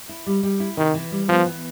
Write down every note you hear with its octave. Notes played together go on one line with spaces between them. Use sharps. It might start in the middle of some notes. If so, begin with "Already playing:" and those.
E4
G3
G3
E4
C3 D#3
E3
G3
F3 B3
E3